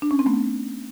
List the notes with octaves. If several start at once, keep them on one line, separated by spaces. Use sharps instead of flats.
D4
C#4
C4
A3 B3